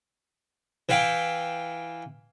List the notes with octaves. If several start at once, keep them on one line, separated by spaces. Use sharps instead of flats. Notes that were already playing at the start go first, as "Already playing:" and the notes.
E3 E4 F5 G5